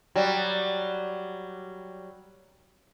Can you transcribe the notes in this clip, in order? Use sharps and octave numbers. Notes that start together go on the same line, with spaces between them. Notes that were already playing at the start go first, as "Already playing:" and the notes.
F#3 G3